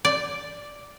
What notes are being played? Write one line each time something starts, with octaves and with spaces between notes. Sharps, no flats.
D5